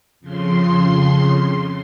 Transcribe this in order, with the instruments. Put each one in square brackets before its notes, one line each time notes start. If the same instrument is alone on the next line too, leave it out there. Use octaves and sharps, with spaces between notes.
[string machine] F2 C#3 C6